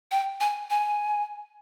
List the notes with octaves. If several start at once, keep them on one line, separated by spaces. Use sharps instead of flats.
G5
G#5
G#5